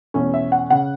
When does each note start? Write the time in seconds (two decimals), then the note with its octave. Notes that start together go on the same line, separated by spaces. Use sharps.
0.14 E2 B2 A3 C#4
0.34 E5
0.52 F#5
0.70 C#3 F#5